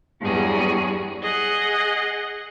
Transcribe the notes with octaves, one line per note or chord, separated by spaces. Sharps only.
E2 G2 F#3 G3 F#4 G#4
G#4 D#5 F#5